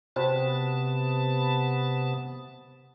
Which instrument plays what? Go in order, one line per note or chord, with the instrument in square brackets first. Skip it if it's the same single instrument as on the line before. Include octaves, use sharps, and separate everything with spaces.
[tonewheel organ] C3 B3 A5 [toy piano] F#4 C5 G5